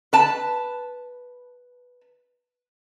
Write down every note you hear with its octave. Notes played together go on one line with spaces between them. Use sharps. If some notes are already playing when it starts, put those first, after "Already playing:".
B4 A5